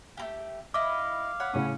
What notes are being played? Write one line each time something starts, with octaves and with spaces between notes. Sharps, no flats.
A3 A#3 G4
E4 D#5 F5 D6
C#5 F#5 B5
A2 C#3 C#4